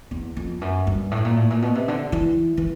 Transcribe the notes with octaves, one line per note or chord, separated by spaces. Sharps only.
E2
F2
F#2
G2
A2
A#2
A2
A#2
B2
C3
D3
E3
E3